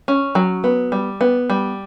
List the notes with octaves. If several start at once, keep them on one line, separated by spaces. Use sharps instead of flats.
C#4
F#3
B3
G3
B3
G3